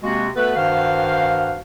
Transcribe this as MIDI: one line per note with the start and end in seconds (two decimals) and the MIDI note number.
0.03 0.28 48
0.03 0.28 56
0.03 0.28 58
0.03 0.28 60
0.03 0.28 66
0.36 0.56 57
0.36 0.56 59
0.36 0.56 66
0.36 0.56 69
0.36 0.56 71
0.56 1.58 43
0.56 1.58 51
0.56 1.58 66
0.56 1.58 72
0.56 1.58 77